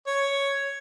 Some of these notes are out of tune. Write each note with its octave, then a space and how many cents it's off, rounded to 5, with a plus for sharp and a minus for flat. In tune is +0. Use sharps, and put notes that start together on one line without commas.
C#5 +5